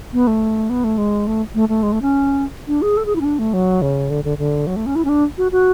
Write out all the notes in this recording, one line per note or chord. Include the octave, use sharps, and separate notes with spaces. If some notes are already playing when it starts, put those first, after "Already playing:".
B3
A3
B3
A3
G#3
A3
A3
A3
G#3
A3
C#4
D4
G#4
A4
G#4
E4
C#4
D4
A3
F#3
C#3
D3
D3
D3
F#3
A3
C#4
E4
C#4
D4
F#4
F#4